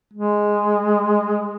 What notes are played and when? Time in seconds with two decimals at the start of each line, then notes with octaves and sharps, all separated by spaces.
0.13 G#3